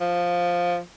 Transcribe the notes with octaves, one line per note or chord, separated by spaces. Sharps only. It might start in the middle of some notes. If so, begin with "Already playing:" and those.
F3